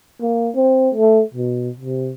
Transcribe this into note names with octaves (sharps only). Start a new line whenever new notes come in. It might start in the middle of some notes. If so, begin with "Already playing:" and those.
A#3
C4
A3
B2
C3